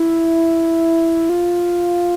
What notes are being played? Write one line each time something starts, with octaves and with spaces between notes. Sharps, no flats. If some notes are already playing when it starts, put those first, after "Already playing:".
Already playing: E4
F4